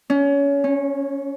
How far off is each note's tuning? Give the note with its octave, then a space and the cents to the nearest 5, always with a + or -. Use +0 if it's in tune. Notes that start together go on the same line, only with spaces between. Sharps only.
C#4 +25
C#4 -20